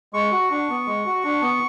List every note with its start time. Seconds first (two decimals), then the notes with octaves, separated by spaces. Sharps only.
0.14 G#3 C#6
0.32 F#4
0.51 D4
0.69 B3
0.87 G#3
1.06 F#4
1.24 D4
1.42 B3